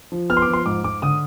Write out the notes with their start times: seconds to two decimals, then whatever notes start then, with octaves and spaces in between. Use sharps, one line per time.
0.12 F3
0.30 B3 F6
0.37 C6
0.42 D6
0.48 F3
0.53 C6
0.66 G#2 D6
0.84 G#2 D6
1.02 D3 D#6